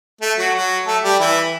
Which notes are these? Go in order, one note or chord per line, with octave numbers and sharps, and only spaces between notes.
A3
F#3 F#4
F#3 F#4
A3 A4
G3 G4
E3 E4